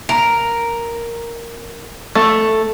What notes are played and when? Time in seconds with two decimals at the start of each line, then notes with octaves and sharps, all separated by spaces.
0.09 A#4
2.15 A3